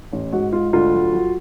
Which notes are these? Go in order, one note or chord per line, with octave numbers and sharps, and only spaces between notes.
A1
G#2 F#4
G#2 F4
D2 F4
F#3
F#3